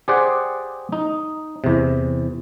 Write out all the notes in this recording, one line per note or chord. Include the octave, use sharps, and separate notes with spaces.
G4 G#4 C5 D5 F#5 G5
D#4
E2 C3